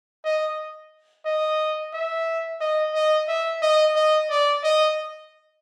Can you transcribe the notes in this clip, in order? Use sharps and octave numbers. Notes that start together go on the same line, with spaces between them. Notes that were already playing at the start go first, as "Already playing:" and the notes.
D#5
D#5
E5
D#5
D#5
E5
D#5
D#5
D5
D#5